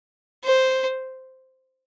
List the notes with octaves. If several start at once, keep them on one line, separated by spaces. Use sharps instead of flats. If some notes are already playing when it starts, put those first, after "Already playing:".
C5